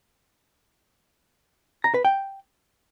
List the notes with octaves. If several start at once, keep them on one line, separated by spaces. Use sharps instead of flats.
A#5
B4
G5